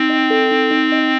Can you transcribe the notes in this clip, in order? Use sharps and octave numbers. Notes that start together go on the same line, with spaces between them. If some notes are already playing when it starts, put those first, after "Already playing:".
Already playing: C4 D#4
D#5
A4
D#4
D#4
D#5